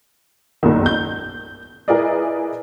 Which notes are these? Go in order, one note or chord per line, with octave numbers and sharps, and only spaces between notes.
F#1 B1 G2 D#3
G6
E4 G#4 A#4 B4 D5 D#5